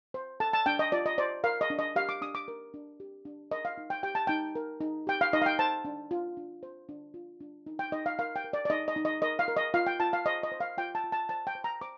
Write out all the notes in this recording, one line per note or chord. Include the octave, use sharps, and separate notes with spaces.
C5
A4 A5
A5
D4 G5
D#5
F4 D5
D#5
C5 D5
A#4 F5
D#5
D4
D#5
G4 F5
D6
D4 D#6
D6
A#4
D4
G4
D4
A#4 D#5
F5
D#4
G5
G4 G5
A5
D#4 G5
A#4
D#4
G4 G5
F5
D#4 D#5
F5
G5
C5 A5
D4
F4
D4
C5
D4
F4
D4
D#4
G5
D#4 D#5
F5
A#4 F5
G5
A#4
D5
D5
D#4 D#5
D#5
D#4
D#5
A#4 D#5
F5
A#4
D#5
F4 F5
G5
F4 A5
F5
C5 D#5
D#5
C5
F5
F4 G5
A5
F4
A5
C5 A5
G5
C5
A#5
C5 D6